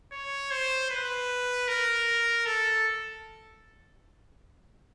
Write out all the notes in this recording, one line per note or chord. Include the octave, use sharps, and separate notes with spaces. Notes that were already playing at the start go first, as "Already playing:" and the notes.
C#5
C5
B4
A#4
A4